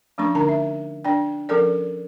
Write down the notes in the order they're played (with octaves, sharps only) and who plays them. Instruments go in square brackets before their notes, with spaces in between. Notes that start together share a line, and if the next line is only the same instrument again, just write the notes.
[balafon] F3 A3 C#4 D4 C#6
D3 D4 D#4 A#4 A5 A#5
E5
D4 D5 G5
F3 C#4 A4 A#4 D5